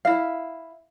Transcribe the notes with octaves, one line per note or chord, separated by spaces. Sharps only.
E4 F5